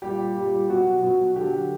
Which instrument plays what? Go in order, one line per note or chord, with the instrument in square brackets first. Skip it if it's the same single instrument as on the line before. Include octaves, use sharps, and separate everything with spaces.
[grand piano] A#2 G3 G4
A#2 G3
B2 F#3 F#4
B2 F#3
D3 F#3 G4